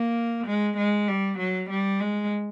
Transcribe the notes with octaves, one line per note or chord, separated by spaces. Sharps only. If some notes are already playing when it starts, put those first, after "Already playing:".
Already playing: A#3
G#3
G#3
G3
F#3
G3
G#3